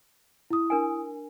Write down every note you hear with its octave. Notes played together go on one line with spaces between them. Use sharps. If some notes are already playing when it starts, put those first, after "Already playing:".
E4 D#6
D4 A#4 G#5